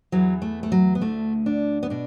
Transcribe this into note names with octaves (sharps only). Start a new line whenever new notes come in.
E2 E3 F#3
A3
A3
F#3
B3
D2 D3 A3
D4
B3
B2 D4